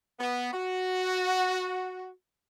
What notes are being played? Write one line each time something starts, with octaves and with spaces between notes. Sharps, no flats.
B3
F#4